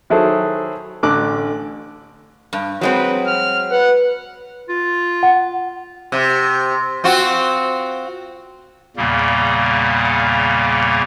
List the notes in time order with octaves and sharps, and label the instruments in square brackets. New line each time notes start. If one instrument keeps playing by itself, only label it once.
[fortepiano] D#3 F#3 E4 G#4 A4 C5
A1 D3 D6 F#6
[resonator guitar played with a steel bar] G2
[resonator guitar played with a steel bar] F#3 G#3 C4 [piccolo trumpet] B4
[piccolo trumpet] F6
[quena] B4 [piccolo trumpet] F#5
[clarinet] F4
[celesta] F#5
[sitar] C3
C4 F4 F#4
[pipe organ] E2 A#2 C#3 G3 A#3